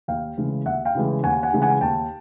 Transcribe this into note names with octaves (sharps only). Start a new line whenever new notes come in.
D#2 F5 G5
C#3 E3 G#3
D#2 E5 F#5
F5 G5
C#3 E3 G#3
D#2 F#5 G#5
F#5 G#5
C#3 E3 G#3
F#5 G#5
D#2 G5 A5